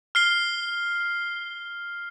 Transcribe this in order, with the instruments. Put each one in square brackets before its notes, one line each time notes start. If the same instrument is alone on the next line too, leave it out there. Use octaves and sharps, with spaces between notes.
[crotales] F6 C7 G7